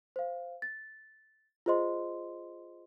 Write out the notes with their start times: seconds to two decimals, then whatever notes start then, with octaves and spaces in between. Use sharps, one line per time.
0.16 C5 F5
0.62 A6
1.66 F4 G#4 C5 D#5 C6